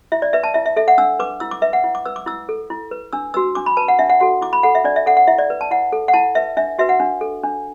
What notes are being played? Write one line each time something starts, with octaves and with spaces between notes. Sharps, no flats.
E4 E5
D5
B4 E5
A5
E4 E5
E5
A4 E5
F#5
D4 E6
B4 D6
E4 E6
D6
B4 E5
F#5
E4
D6
B4 E6
D6
E4 E6
A4
E4
B4
D4 E6
F#4 B4 E6
D4 D6
B5
B4 A5
F#5
D4 E5
F#5
F#4 A4 F#5
E4 D6
B5
A4 F#5
E5
D4 D5
E5
A4 F#5
F#5
E4 E5
D5
B4
A5
E4 F#5
A4
F#5
E4 A5
B4 E5
D4 E5
F#4 B4 E5
F#5
D4
A4
D4